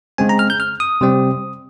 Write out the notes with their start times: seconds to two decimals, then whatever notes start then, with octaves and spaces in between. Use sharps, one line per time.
0.18 C#3 G#3 C4 G#5
0.29 A#5
0.39 F6
0.50 G6
0.60 F6
0.80 D#6
1.01 C3 G3 C4